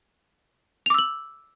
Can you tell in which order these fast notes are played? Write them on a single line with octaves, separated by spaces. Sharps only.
F7 D6 E6 F#7